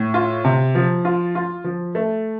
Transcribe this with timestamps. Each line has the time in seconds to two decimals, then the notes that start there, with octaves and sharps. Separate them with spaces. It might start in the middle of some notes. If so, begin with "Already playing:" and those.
Already playing: A2
0.14 F4
0.44 C3
0.75 F3
1.05 F4
1.35 F4
1.64 F3
1.95 A3